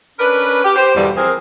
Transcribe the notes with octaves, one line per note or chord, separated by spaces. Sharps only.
C#4 D4 A#4 B4
G4
G4 C5
E2 G2 B2 D3 G3
F3 C4 G#4 A#4